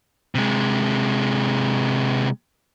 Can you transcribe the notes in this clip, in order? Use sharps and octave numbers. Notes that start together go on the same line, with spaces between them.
C3 G#3